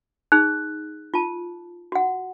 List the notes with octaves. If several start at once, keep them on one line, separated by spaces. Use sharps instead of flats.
D#4 G#4 F#6
F4 A5
F#4 F#5